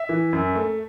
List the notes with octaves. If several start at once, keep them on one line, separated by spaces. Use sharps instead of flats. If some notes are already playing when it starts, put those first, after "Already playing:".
Already playing: E5
E3
F#2
A3